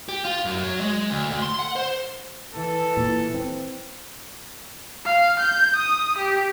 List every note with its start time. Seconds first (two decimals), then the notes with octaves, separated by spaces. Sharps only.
0.09 G4
0.25 F4
0.45 F#2
0.63 F#3
0.81 G#3
1.10 D2
1.30 D2
1.42 C6
1.59 F#5
1.76 C5
2.54 E3 A4
2.97 A#2
3.34 C4
5.05 F5
5.40 G6
5.77 D#6
6.19 G4